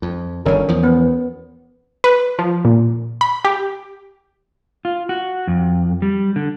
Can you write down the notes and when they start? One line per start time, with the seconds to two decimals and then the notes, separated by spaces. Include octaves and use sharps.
0.02 F2
0.46 G1 D3 D#3 C#4 A#4
0.68 E2 F3
0.83 B3
2.04 B4
2.39 F3
2.65 A#2
3.21 B5
3.45 G4
4.85 F4
5.09 F#4
5.47 F2
6.02 G3
6.36 D3